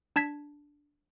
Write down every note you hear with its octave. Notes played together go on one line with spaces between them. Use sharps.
D4 A5 G#6 B6